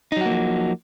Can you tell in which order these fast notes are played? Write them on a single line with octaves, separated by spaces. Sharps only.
D#4 F#3 F#4 A#3 F3